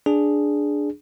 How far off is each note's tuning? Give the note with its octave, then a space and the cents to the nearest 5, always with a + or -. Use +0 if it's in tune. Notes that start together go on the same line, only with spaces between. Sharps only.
D4 +0 G#4 +0